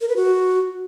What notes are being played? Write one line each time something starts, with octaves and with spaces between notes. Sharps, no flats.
A#4
B4
F#4